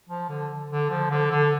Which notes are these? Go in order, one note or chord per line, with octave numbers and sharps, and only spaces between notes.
F3
D3
D3
F3
D3
D3